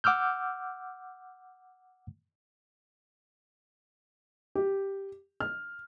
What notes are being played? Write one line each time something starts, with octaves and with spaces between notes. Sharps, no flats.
F#5 D6 E6 F6 G6
G4
F6